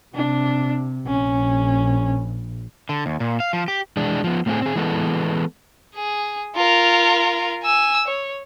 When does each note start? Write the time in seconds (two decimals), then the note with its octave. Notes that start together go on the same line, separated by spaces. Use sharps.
0.15 C3 D4
1.07 A#1 C#4
2.89 D3
3.06 D#2
3.20 A#2
3.40 F5
3.53 F3
3.68 G4
3.97 E3 G#3 D4
4.24 F3 B3
4.46 A2 A3 C4 F4 G#4
4.62 C4 G#4
4.76 E3 G#3 B3 A4
5.95 G#4
6.56 F4 A#4
7.63 G#5 E6
8.08 C#5